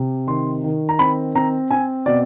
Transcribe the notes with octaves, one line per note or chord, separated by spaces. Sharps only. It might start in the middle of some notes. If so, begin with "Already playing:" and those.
Already playing: C3
D#3 C6
D#3
A#5
C4 B5
C4 A#5
C4 G#5
B2 D5